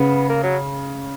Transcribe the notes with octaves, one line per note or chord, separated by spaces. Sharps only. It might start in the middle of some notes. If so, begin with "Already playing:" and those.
Already playing: C#3 B3
A#3
F#3